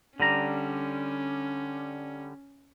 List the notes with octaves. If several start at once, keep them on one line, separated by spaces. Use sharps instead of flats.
D3 G3 C#4 A#5